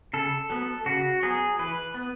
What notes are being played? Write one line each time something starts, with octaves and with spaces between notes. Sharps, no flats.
C#3 A4
F#3 B3
C#3 F#4
F#3 B3 G#4
E3 B4
B3